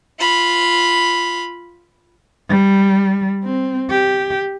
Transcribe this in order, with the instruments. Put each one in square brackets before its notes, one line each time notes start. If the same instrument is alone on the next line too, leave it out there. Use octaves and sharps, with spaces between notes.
[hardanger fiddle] F4 B5
[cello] G3
C4
G4